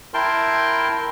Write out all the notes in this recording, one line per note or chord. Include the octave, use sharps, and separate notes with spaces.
E4 A#4 G5 A5 C6